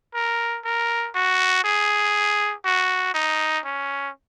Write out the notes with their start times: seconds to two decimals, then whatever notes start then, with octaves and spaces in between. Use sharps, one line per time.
0.14 A#4
0.65 A#4
1.15 F#4
1.64 G#4
2.65 F#4
3.14 D#4
3.65 C#4